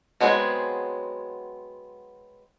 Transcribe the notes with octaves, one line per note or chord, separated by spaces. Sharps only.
F#3 G#3 B3 C4 G#4